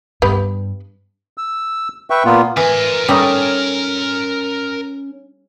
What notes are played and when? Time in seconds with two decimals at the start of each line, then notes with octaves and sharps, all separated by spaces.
0.22 G2 B3 G4 B4
1.38 E6
2.10 B4 E5 G5 C#6
2.25 A#2 A#3 B3 F4
2.57 E3 A#4 G#5
3.09 G3 A3 C#4 D#4